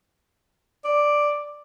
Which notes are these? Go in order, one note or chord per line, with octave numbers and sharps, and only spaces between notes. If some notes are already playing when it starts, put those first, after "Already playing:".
D5